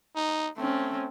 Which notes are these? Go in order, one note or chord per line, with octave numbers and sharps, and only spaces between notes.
D#4
A3 C4 C#4